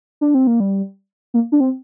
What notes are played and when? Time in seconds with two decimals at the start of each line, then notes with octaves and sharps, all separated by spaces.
0.21 D4
0.34 C4
0.47 A#3
0.60 G3
1.34 A#3
1.52 D4
1.60 C4